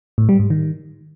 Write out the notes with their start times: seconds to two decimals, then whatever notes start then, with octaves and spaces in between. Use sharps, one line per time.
0.18 A2
0.29 G3
0.40 G#2
0.50 D#3